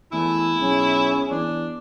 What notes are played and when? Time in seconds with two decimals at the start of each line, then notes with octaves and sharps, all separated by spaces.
0.12 E2 A3 E4 G#5
0.60 B1 C#4 G#4
1.31 E2 D4